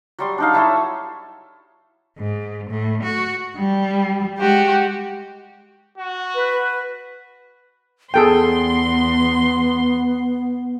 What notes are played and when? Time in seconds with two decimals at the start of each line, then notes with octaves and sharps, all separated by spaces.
0.19 F#3 G3 C6
0.38 D4 D#4 F5
0.53 F#3 E4 A4 C#5
2.18 G#2
2.70 A2
3.03 F#4
3.57 G3
4.38 G#3 F#4 G4
5.97 F#4
6.35 B4
8.14 E2 B3 G#4 A4 G5 C6